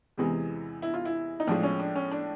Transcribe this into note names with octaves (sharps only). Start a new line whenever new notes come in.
E2 C3 E3 G#3
E4
F4
E4
D#4
A2 F3 G#3 D4
C#4
D4
C#4
D4